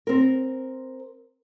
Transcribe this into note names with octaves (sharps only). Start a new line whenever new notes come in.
C4 A#4